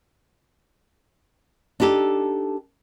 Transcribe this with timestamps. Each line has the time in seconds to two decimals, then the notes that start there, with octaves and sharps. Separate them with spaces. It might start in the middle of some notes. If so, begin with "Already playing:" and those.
1.80 D4 D#4 G4 A4